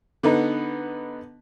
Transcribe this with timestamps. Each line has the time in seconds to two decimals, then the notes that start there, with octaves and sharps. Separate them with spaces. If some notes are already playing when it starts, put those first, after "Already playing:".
0.23 D3 B3 D#4